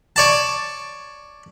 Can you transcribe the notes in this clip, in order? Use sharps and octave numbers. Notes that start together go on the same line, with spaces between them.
C#5 D5 A5